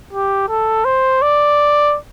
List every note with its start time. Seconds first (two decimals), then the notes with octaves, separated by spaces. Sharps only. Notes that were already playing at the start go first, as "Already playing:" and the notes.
0.13 G4
0.49 A4
0.85 C5
1.22 D5